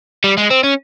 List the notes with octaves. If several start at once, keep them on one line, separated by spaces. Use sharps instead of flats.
G3
G#3
C4
C#4